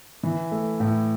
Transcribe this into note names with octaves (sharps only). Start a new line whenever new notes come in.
E3
A3
A2